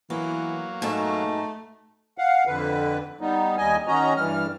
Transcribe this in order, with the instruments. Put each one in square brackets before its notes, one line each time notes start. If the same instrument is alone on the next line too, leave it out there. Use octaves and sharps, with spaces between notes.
[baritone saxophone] E3 [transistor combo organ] F#3 A#3 [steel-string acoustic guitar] B3
[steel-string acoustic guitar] G#2 B2 A4 [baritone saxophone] A3 [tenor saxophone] D#4
[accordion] F5 F#5
F2 D3 B4
G3 B3 D#4
D#2 G3 D#5 G#5
D#3 C#4 F#4 D#5 A#5
G2 E3 G3 F6